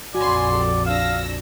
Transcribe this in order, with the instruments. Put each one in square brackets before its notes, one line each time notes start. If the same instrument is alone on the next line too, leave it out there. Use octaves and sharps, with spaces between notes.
[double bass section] A#1 F2 [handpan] F#4 [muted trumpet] D5 [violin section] G#5 B5 C6
[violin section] G4 A4
[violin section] D4 E6 A#6 [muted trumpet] F5